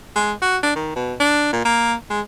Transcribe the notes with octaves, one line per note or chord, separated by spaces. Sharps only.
G#3
F#4
D4
D#3
B2
D4
A#2
A#3
G#3